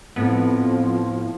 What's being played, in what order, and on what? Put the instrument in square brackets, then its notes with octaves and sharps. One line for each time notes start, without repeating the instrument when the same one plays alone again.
[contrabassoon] F2 [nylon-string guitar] A2 [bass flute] F3 [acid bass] B3